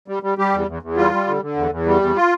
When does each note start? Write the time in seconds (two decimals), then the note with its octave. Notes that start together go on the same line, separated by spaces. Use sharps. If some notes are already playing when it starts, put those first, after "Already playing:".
0.08 G3
0.23 G3
0.38 G3 G4
0.53 E2
0.67 E2
0.83 E2
0.97 G3 F4
1.12 G3
1.27 D3
1.42 D3
1.56 E2
1.71 E2
1.86 G3
2.02 E2
2.16 F4